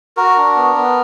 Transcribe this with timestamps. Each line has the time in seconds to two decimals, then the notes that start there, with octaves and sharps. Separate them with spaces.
0.17 F#4 A#4
0.36 D4
0.56 B3
0.75 B3